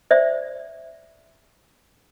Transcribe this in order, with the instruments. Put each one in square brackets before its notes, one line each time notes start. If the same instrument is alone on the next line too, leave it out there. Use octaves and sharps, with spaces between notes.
[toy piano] C5 D5 E5